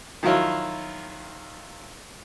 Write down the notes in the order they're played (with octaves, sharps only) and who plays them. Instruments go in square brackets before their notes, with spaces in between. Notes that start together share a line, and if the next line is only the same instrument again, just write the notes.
[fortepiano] D#3 F3 F#3 E4 F4